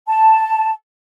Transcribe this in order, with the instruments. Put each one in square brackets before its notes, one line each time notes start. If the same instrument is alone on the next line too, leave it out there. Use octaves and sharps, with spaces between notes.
[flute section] A5